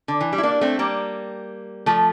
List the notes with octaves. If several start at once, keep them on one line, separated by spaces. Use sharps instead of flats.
D3
E3
G3
E4
A#3 D4
A3 C4
G3 A#3
F3 A3